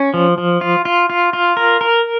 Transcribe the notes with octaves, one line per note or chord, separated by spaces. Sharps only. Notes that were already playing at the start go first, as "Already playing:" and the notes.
Already playing: C#4
F3
F3
F4
F4
F4
F4
A#4
A#4